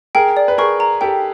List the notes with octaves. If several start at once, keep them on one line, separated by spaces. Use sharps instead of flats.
G#4 A#4 G5
D5
B4
G#4 A#4 C#6
A#5
G4 A4 G5